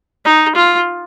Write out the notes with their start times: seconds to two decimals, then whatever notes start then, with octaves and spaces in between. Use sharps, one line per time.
0.25 D#4
0.56 F4